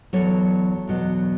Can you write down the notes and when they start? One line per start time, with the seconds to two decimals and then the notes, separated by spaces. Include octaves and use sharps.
0.13 E2 B2 F#3 A4 C#5
0.88 E2 B2 F#3